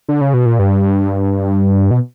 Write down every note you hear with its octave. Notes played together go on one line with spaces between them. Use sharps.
D3
C#3
B2
A#2
G2
B2